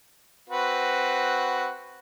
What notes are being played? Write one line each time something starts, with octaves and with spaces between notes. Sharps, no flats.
C4 F#4 B4